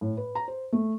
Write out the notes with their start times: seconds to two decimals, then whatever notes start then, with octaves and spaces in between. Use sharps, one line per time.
0.01 A2
0.17 B4
0.35 A#5
0.48 C5
0.72 A3